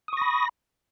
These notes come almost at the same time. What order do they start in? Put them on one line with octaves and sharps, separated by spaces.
D#6 C#6 A#6 B5